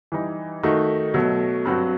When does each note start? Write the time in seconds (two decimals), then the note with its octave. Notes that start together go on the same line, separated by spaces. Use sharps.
0.12 E3 G3 D#4
0.63 D#3 A3 D#4 F#4
1.14 B2 F#3 A3
1.65 G2 F#3 C4 F#4